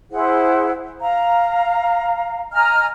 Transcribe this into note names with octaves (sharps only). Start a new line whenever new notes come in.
E4 G#4 C5 F#5
F5 A#5
D#5 G#5 A#5 F6